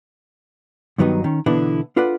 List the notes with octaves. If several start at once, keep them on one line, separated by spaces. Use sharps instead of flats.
G2 D#3 F#3 B3 D#4
D#3 C#4
B2 D3 E3 B3 D4 E4
D4 F4 A4 B4 D5 F#5